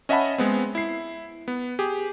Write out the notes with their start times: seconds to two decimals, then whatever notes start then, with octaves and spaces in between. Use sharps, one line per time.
0.09 C#4 D#5 E5 F#5 A5 B5
0.38 G#3 B3 C4
0.75 E4 C7
1.48 B3
1.79 G4 G#4